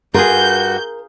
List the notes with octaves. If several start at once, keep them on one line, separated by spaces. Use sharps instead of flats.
G2 F4 F#4 G#4 A#4 G6